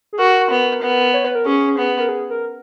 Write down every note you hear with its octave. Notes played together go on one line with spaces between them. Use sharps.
G#4
F#4 A#4
B3
B3
C#5
B4
A#4
C#4 G#4
B3
A#4
G#4
A#4